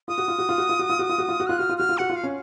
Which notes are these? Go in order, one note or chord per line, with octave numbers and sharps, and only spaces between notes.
F4 D#6
F#4
F4
F#4
F4
F#4
F4
F#4
F4
F#4
F4
F#4
F4
F#4
F4 F#6
F#4 F6
F4
F#4 F6
F4
F#4 F#5
F4
F5
C#4